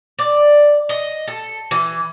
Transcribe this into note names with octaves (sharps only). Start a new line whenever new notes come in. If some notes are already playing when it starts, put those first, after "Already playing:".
D5
D#5
A4
E3